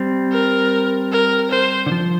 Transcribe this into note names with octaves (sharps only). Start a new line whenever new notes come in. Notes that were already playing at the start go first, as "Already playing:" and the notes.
Already playing: G3 C4
A#4
A#4
C5
D3
F3